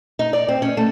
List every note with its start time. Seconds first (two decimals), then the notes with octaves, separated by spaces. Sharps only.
0.19 D#4
0.33 D5
0.48 C4
0.62 C#4
0.77 A3